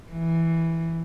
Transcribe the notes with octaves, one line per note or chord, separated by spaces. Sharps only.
E3